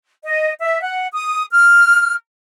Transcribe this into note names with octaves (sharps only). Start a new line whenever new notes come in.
D#5
E5
F#5
D#6
F6